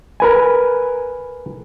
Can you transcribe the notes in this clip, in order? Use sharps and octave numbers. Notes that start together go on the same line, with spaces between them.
A#4 B4 G#5